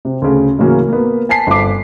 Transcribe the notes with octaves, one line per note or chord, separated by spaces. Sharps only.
C3
D2 C#3
A2 C#3 E3 F#3 A#3 C#4
A#3 B3
G#5 A5 B6 C7
G1 C4 D6